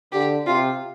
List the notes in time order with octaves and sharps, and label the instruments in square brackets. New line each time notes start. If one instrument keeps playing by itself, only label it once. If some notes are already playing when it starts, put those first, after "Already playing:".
[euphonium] D3 [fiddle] G4
[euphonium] C3 [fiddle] F4